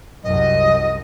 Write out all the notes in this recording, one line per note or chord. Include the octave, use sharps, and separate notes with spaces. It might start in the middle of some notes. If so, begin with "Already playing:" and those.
C2 F#2 D#5